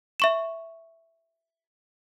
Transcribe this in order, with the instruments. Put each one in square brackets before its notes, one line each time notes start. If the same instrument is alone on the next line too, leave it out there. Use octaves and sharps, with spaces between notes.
[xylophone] E5 C#6 E7